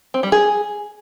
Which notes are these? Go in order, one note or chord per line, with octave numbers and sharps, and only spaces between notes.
C4
G3
G#4